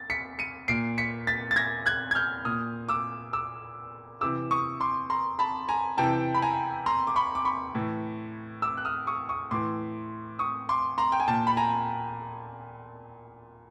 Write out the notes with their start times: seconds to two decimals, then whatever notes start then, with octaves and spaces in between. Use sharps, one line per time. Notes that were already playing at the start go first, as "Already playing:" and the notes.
Already playing: A6
0.10 B6 C#7
0.39 C#7 D#7
0.68 A#2 C7 D7
0.98 B6 C#7
1.27 A6 B6
1.51 A6
1.56 G#6 A#6
1.86 F#6 G#6
2.11 G#6
2.15 F6 G6
2.45 A#2 D#6 F6
2.89 D6 E6
3.33 D6 E6
4.21 C3 E3 D6 E6
4.51 C#6 D#6
4.80 C6 D6
5.10 A#5 C6
5.39 A5 B5
5.69 G#5 A#5
5.98 C3 E3 G5 A5
6.34 B5
6.42 G#5 A#5
6.86 A#5 C6
7.07 D6
7.16 B5 C#6
7.35 D6
7.45 B5 C#6
7.75 A2 E3
8.62 D6 E6
8.77 F#6
8.85 D#6 F6
9.07 C#6 D#6
9.29 C#6 D#6
9.51 A2 E3 C6 D6
10.39 C#6 D#6
10.69 C6 D6
10.98 A#5 C6
11.12 G5
11.20 G#5
11.28 A#2 G5 A5
11.47 B5
11.57 G#5 A#5